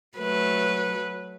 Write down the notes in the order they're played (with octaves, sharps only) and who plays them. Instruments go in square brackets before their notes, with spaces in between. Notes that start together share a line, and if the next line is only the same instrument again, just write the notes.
[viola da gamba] F#3 A3 B4